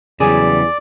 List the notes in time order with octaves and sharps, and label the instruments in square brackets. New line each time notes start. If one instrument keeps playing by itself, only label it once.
[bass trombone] E2 [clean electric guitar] C#3 F#3 G3 [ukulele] G#4 [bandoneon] D5